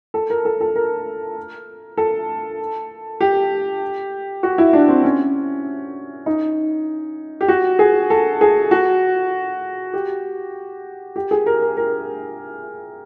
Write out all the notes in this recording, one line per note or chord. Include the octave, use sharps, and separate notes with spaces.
A4
A#4
A4
A4
A#4
A4
G4
F#4
E4
D4
C4
C#4
D#4
G4
F#4
G#4
A4
G#4
F#4
G4
G4
G#4
A#4
A#4
A#4